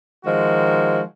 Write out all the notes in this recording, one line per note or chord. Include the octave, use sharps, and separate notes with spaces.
D#3 F3 G#3 F#4